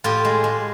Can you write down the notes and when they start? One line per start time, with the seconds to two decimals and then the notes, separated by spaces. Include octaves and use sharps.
0.04 A2 F4 G4
0.25 G#3
0.44 G#3